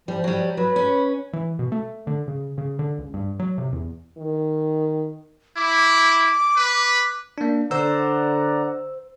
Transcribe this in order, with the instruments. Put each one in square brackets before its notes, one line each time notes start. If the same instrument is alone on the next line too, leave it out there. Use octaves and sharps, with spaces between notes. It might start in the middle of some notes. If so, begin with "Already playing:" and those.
[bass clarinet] F3 [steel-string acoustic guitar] G3
[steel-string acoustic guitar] F#3 G3
[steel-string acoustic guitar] F#3 [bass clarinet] B4
[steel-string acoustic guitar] C#4
[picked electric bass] E3
B2
A3
D3
C#3
C#3
D3
C#2
G2
F#3
C3
E2
[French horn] D#3
[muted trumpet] E4 [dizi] D6
[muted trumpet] B4
[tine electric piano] A#3 D4
[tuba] D3 [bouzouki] C5 [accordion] D5 F#5 A#5 [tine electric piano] E6